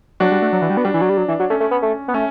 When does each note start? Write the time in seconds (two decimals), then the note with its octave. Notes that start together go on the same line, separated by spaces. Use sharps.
0.20 F#3 D4 F#4
0.32 G3
0.42 A3
0.52 F#3
0.62 E3
0.70 G3
0.77 B3
0.85 G3 D4
0.94 E3
1.01 F#3
1.09 G3
1.17 F#3
1.28 E3
1.40 F#3
1.50 A3 C#4
1.60 A3
1.71 B3
1.82 A3
2.08 B3
2.14 A3 C#4